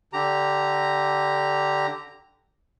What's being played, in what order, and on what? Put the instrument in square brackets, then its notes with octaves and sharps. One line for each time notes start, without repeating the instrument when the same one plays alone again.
[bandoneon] D3 G4 A#5